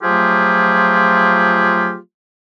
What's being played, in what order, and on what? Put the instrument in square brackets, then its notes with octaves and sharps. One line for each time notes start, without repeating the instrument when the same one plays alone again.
[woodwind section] F3 F#3 A3 F4 G4 G#4